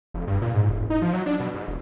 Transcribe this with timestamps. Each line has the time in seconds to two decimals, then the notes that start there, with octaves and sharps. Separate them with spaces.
0.14 F1
0.27 G2
0.42 A#2
0.54 G#2
0.69 E1
0.90 D#4
1.02 F3
1.13 F#3
1.26 D4
1.40 B2
1.54 G#2
1.68 E1